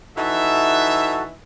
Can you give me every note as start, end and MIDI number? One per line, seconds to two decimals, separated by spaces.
0.17 1.33 52
0.17 1.33 63
0.17 1.23 66
0.17 1.23 69
0.17 1.33 76